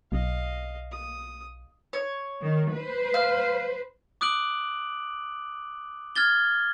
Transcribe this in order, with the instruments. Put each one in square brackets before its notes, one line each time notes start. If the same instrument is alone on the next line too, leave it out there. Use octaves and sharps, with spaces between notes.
[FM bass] B1 [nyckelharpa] D#5 F5
[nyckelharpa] D#6
[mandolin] C#5
[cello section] D#3
B4 C5
[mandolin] F5
[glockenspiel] D6 D#6 F#6 D7 F#7
F6 G#6 A6 G7